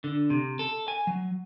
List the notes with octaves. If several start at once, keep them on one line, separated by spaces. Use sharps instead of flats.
D3
C3
A4
G#5
F#3